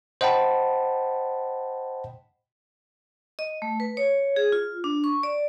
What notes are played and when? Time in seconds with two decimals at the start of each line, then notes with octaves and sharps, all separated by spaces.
0.21 C5 D#5 F#5 G5 A5 B5
3.39 D#5
3.62 A3
3.80 B4
3.97 C#5
4.36 G#4
4.52 F4
4.84 D4
5.04 C#6
5.23 D5